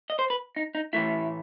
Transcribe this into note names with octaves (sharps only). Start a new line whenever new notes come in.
D#5
C5
B4
D#4
D#4
A2 E3 A3 E4